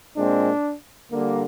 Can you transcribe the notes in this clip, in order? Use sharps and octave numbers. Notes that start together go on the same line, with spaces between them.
A#2 G#3 C4 D4
D3 G3 A#3